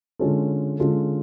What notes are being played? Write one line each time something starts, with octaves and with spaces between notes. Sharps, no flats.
D3 G#3 C#4 F4 A4
D3 G#3 C#4 F4 A4